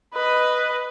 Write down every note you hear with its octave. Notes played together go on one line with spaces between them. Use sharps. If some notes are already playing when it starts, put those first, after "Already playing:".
B4 D#5